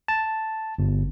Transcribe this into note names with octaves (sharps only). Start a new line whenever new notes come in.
A5
G1